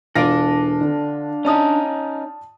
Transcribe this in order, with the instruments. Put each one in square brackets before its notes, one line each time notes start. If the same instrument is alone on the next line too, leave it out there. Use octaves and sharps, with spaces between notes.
[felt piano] E1 [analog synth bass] D4 [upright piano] F4 A#6 [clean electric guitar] A4 D5
[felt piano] D3
[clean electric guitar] C#4 D#4 [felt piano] D5 A5 D#6